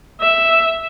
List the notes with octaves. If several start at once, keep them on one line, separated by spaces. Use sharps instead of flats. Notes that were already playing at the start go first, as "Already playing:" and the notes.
E5